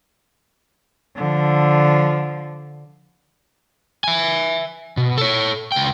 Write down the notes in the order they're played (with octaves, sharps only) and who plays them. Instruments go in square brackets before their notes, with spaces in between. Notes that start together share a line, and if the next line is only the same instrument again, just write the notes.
[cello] D3 F3
[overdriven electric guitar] E5 G#5
B2
A4 C#5
C#2 G5